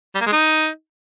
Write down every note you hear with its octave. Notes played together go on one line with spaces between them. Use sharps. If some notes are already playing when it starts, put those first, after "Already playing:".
G3
A#3
G#3
D#4